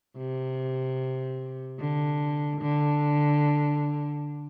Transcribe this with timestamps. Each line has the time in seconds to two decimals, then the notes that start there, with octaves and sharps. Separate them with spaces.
0.17 C3
1.80 D3
2.61 D3